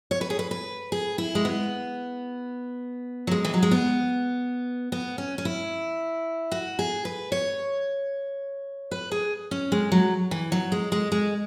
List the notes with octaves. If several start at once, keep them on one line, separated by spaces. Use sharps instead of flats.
C#5
B4
G#4
B4
B4
G#4
E4
G#3
B3
F#3
G#3
E3
F#3
G#3
B3
B3
C#4
C#4
E4
F#4
G#4
B4
C#5
B4
G#4
C#4
G#3
F#3
E3
F#3
G#3
G#3
G#3